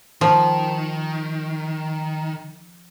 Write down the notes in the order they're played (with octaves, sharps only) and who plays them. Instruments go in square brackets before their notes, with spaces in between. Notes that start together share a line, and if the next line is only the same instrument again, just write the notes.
[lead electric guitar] D#3 [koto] F3